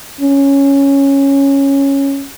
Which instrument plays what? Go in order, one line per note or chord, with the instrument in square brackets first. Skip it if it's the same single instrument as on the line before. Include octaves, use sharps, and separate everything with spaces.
[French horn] C#4